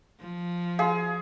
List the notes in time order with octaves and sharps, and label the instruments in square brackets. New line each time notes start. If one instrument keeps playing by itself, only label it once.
[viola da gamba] F3
[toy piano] F#4 F5 [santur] G#4